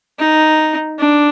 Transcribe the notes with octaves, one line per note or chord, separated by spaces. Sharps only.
D#4
D4